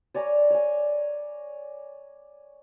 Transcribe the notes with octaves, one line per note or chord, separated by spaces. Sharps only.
C#5 D5 G#5 A#5
C#5 D5 G#5